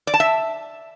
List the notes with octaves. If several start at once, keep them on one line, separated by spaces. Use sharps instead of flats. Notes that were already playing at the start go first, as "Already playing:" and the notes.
D5
A5
E5